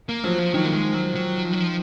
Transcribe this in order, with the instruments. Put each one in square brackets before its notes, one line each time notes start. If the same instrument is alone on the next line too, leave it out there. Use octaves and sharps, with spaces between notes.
[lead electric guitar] A#3
[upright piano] F3 [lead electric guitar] F#3
[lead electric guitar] F3
[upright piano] D#3 [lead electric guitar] F#3
[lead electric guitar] A#3
G#3
F#3
F#3
F3
F#3
F3